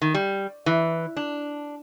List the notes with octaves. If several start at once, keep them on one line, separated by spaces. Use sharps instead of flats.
D#3
G3
E3
D4